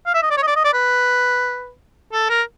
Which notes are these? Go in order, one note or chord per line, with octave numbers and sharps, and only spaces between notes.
F5
E5
D#5
D5
C#5
D#5
D5
D#5
D5
B4
A4
A#4